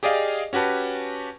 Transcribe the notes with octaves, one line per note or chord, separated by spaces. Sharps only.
G4 G#4 D5 D#5 F5
C#4 F#4 G4 B4 A5